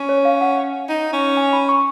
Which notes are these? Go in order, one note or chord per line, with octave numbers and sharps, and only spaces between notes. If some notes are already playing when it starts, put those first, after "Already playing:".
Already playing: C#4
C#5
F5
F#5
D#4
C#4
G#5
B5
C#6